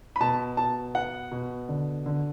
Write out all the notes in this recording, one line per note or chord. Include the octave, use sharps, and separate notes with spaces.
B5
B2 A5
B2 A5
B3 F#5
B2
D3
D3